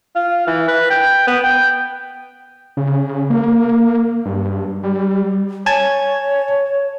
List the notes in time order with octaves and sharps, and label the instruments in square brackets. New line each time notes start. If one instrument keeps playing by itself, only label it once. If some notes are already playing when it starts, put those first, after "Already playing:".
[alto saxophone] F4
E3
B4
G5
B3
G5
[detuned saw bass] C#3
A#3
G2
G3
[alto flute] C#5 [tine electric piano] G#5 A5 G#6